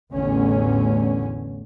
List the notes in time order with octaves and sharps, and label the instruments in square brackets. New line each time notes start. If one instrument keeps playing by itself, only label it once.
[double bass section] A1 E2 A2 D3 C#4